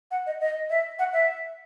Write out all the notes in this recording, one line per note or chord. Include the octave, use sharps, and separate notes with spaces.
F#5
D#5
D#5
E5
F#5
E5